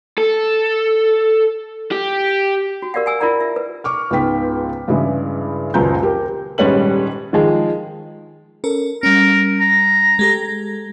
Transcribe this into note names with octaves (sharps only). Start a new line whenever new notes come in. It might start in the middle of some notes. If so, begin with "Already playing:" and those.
A4
G4
F#4
G4 A#4 D5 F5 F#5
F#5 G#5 E6
E4 F4 A#4 D5 F#5 A#5
E5
B4
C#6 D6 F6
C#2 G#2 B3 G5 B6
G2 C#3 E3 G#3 E4
D#1 C#2 F#2 F4 A#5 G6
G4 A#4
D#1 G#2 G3 C#4 B4 F#7
D#3 F3 G#3 G#4
C#4 A4 A#4
G3 C#4 A#4
A#5
G#3 G4 A4